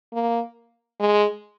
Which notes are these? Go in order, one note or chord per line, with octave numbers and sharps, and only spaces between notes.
A#3
G#3